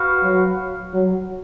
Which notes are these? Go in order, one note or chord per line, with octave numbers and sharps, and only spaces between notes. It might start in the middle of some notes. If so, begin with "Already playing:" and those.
Already playing: F#4 B4 F5
F#3
F#3